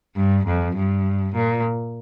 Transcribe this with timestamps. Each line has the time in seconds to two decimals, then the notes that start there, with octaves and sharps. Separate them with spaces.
0.16 G2
0.46 F2
0.76 G2
1.35 A#2